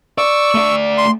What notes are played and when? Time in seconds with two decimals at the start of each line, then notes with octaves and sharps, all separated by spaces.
0.18 D5 C#6 E6
0.55 A3 D5
0.98 C6